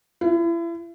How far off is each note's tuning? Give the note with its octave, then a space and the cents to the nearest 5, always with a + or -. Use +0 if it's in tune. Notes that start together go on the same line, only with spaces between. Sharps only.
E4 +35